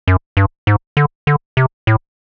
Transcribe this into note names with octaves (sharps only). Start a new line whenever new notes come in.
F#2
G2
G#2
D3
D3
C3
A2